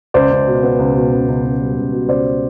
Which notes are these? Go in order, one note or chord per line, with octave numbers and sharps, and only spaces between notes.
C#2 C5 D5
C#2
B2
B3
C#2
B2
C#2
C#2
C#2
G3
C#2
B2
C#2 C5 D5